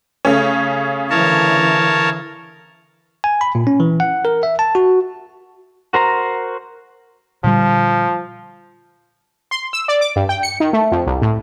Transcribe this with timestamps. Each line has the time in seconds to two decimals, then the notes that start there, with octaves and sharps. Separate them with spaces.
0.25 C#3 A3 C#4
1.10 D3 E3 A#4 C#5 A5
3.24 G#5
3.41 B5
3.55 A#2
3.67 C#4
3.80 E3
4.00 F#5
4.25 A#4
4.43 E5
4.59 A5
4.75 F#4
5.93 F#4 A#4 C5 A#5
7.44 A#2 D3 F3 G3
9.51 C6
9.73 E6
9.88 D5
10.01 D6
10.16 G2
10.29 G5
10.43 C#7
10.60 D#3
10.73 A3
10.92 F2
11.07 C2
11.22 A2